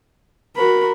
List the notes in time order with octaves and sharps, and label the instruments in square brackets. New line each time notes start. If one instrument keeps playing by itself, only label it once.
[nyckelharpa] F#4 B5 [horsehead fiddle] A#4